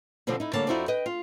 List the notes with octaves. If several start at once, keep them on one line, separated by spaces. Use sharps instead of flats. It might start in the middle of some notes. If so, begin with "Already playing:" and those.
B2 D3 F3 C4 D4
D#4 E4
D2 D3 G3 A#3 C#5 A5
F2 D#4 E4 F#4 C5 D5
B4 D#5 G5
F4